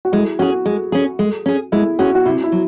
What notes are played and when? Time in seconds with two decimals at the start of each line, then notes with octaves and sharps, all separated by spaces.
0.05 F#4
0.12 G#3 E4
0.39 C#4 F#4 G#4
0.66 G#3
0.92 C#4 G#4
1.19 G#3
1.46 C#4 G#4
1.72 G#3 E4
1.99 C#4 F#4 G#4
2.15 F#4
2.25 C3 E4
2.44 E4
2.52 F#3